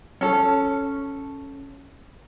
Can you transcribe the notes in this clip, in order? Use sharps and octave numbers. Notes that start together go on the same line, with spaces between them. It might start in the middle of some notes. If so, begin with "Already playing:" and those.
C#4 A4